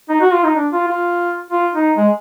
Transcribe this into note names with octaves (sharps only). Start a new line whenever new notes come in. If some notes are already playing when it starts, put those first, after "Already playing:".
D#4
F#4
F4
D#4
D4
F4
F4
F4
D#4
G#3